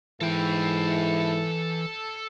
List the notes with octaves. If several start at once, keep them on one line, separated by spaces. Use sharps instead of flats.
G#2 E3 E4 A4 G5